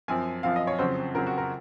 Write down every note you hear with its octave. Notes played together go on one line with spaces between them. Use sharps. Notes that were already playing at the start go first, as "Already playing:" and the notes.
F#2 F3 C4 G#5
F#2 F3 C4 F5
D#5
C#5
F2 C#3 F#3 C4 C5
F2 C#3 F#3 C4 A#4
F#4
A#4